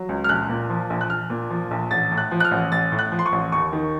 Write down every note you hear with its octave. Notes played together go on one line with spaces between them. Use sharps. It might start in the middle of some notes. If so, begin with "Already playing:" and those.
Already playing: F#3
C#2
F6
A#1 F#6
A#2
F3
A#1
F#6
A#1 F6
A#2
F3
A#1
A1 A6
A2
F#6
F3
F#6
F6
A1
A1 A6
A2
F#6
F3
C6
C#6
A1
D#2 C#6
D#3